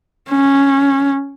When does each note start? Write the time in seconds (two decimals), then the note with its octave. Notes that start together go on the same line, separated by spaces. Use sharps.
0.30 C#4